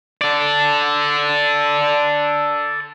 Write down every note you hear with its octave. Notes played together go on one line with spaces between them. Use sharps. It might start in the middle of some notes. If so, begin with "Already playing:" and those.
A4 D5